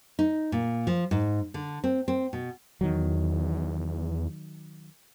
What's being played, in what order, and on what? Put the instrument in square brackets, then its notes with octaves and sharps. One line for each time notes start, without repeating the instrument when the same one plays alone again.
[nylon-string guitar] D#4
A#2
F3
G#2
D3
C4
C4
B2
[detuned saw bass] E2 [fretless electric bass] D#3 F#3